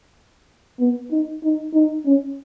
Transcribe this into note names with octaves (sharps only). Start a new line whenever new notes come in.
B3
D#4
D#4
D#4
C#4